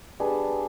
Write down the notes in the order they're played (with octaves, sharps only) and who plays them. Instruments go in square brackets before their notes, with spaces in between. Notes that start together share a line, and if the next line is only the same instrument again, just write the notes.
[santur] G3 B3 D4 G#4